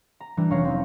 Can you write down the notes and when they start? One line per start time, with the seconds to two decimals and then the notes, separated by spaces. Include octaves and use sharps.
0.20 A#5
0.37 E3 G3 D4
0.50 F1 F#3 C#4 C#5 F5 A#6
0.65 C4 D#4